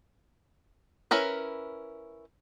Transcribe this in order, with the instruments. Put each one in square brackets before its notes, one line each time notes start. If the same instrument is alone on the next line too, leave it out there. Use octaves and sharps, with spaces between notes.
[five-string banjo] C#4 E4 A#4 B4